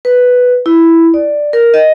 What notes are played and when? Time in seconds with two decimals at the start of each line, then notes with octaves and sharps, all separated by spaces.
0.05 B4
0.66 E4
1.14 D5
1.53 A#4
1.74 D#5